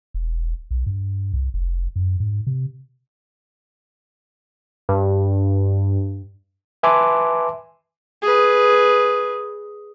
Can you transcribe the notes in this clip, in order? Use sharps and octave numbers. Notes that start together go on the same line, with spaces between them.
E1
B1
G2
C2
F1
F#2
G#2
C3
G2
B4 E5 G#5 A5 C6 D6
G#4 B4